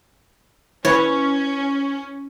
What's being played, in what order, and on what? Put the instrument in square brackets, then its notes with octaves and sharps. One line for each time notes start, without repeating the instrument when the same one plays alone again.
[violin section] C#4 [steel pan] E4 B4 [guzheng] C#5